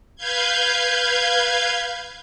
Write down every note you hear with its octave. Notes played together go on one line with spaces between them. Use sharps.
B4 F5 G6 G#6